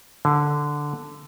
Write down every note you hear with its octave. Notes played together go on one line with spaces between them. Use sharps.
D3